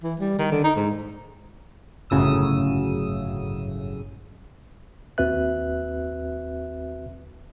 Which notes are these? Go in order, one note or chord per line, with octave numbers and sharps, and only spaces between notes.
E3
G3
D#3
D3
D#4
G#2
G1 F#2 A2 C#3 D#6 E6
D#2 C4 F#4 B4 E5 F#6